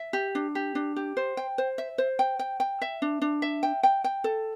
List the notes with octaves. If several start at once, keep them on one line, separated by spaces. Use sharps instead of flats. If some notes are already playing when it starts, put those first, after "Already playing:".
Already playing: E5
G4
D4
G4
D4
G4
C5
G5
C5
E5
C5
G5
G5
G5
E5
D4
D4
E5
G5
G5
G5
A4